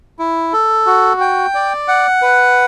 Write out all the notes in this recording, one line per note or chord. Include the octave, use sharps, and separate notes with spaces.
E4
A4
F#4
G5
D5
F#5
B4